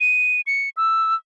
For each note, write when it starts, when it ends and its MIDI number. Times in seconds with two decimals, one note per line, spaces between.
0.01 0.41 99
0.47 0.70 97
0.77 1.15 88